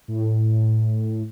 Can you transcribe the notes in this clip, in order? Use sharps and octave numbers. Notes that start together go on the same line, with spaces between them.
A2